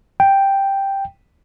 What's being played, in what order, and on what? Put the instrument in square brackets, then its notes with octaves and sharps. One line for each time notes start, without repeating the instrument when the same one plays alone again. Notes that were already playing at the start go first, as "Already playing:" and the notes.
[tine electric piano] G5